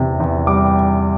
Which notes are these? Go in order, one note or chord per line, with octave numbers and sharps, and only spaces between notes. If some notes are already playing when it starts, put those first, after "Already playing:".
Already playing: E2 C3
E2
G3 D6